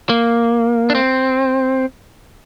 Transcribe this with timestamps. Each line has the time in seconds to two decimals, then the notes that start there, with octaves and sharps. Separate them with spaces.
0.09 A#3
0.90 D4
0.95 C4